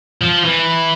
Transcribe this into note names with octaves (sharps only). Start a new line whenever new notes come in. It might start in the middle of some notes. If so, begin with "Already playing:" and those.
F3
E3